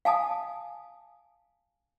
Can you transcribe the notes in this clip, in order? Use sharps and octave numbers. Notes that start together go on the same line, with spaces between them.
F5 G#5 A5 D#6